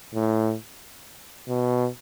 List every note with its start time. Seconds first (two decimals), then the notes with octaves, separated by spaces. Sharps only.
0.15 A2
1.48 B2